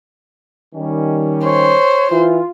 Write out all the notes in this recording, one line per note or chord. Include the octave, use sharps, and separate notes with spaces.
D#3 G3 C#4
C5 C#5
E3 F4